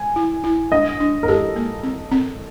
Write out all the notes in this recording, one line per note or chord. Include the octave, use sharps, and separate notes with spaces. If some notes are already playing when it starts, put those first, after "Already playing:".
Already playing: G#5
E4
E4
D4 D#5
D4
A#4
G4 A4
A#3
C4
C4